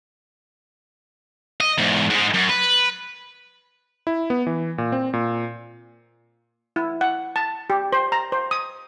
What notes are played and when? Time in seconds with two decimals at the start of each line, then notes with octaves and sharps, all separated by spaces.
1.61 D#5
1.78 E2 G#2
2.10 G#2 G#3
2.34 F#2
2.49 B4
4.07 E4
4.30 B3
4.47 E3
4.78 A#2
4.92 C4
5.13 A#2
6.76 E4
7.01 F#5
7.36 A5
7.70 G4
7.93 C5
8.12 A#5
8.32 C5
8.51 D#6